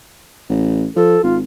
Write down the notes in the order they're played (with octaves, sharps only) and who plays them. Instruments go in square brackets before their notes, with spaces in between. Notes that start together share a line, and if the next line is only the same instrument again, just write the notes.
[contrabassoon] A1
[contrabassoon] F3 [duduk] A4
[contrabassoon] G#1 [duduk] F4